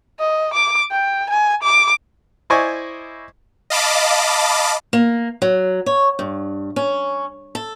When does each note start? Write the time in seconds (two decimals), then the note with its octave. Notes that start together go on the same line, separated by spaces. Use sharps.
0.20 D#5
0.54 D6
0.91 G5
1.30 G#5
1.63 D6
2.50 E4 C5 D5 D#5 G#5 C#6
3.70 D#5 F5 A5 B5 D6
4.93 A#3
5.42 F#3
5.86 C#5
6.19 G2
6.76 C#4
7.55 A4